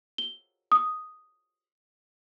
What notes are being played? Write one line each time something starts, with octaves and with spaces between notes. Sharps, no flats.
G7
D#6